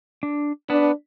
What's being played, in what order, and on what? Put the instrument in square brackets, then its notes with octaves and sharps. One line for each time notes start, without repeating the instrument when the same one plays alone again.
[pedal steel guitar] D4
[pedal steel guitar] B3 B4 A5 [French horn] D4